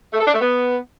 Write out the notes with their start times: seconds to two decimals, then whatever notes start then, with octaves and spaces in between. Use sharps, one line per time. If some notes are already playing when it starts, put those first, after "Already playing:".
0.14 A3
0.20 A4
0.27 D4
0.34 A3
0.41 B3